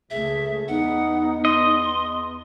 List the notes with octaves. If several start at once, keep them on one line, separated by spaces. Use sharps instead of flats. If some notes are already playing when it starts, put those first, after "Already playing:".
C#2 C#3 A3 G#4 E5
E2 B3 D#4 F#5
D#5 C6